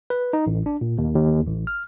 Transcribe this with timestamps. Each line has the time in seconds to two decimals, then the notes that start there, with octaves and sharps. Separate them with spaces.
0.10 B4
0.33 D#4
0.47 A1
0.66 D4
0.81 A#2
0.98 D#2
1.15 D#2
1.47 A1
1.67 F6